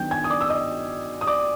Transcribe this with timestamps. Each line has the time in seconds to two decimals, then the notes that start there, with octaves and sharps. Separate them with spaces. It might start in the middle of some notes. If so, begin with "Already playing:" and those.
Already playing: D#3 F#3 B3 D4 G5 G6
0.11 G#5 G#6
0.24 D#6
0.30 D5 D6
0.41 E6
0.50 D#5 D#6
1.21 D#6
1.27 D5 D6